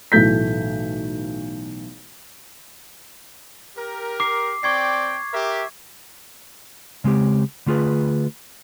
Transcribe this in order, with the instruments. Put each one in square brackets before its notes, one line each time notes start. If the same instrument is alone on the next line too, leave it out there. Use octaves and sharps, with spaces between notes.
[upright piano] B1 A2 E3 A3 G6 B6
[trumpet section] G4 A#4
[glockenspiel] D6 C7
[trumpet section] C4 D5 G5 [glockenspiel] C#6 G#6 C7
[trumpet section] G4 A#4 E5
[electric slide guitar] C#3 G#3 C4 G4
D3 A3 F4 G#4 B4